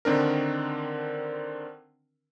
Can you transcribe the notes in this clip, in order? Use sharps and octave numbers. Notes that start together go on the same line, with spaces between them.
D3 D#3 C4 D4 A#4